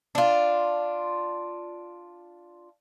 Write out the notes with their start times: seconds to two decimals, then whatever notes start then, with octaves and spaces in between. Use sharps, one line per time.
0.15 D4 F4